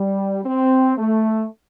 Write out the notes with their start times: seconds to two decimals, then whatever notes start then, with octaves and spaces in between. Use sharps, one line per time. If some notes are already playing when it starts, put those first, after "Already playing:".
Already playing: G3
0.45 C4
0.98 A3